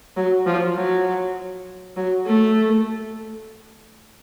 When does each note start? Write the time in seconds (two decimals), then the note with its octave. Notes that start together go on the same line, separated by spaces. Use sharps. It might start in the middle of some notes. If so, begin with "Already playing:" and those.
0.17 F#3
0.46 F3
0.76 F#3
1.96 F#3
2.26 A3